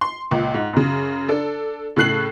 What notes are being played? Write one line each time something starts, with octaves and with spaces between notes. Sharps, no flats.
C6
C#2 A#2
G#2
F#2 C#3
D4 A4
A2 C#3 A4 F#6 C7 F#7